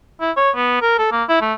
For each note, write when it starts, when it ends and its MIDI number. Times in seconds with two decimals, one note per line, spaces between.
0.21 0.31 64
0.37 0.50 73
0.56 0.81 59
0.81 0.98 70
0.98 1.09 69
1.12 1.24 58
1.28 1.41 64
1.41 1.54 57